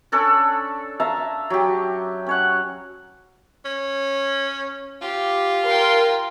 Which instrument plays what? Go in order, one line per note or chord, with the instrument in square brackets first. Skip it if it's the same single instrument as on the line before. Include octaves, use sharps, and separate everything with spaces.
[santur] C#4 D4 A4 D5
E5 F5 A5 A#5
F#3 G4
C#4 C#5 F#5
[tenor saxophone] C#4
[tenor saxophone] F4 [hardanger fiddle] G4
[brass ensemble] A#4 [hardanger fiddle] G5 C6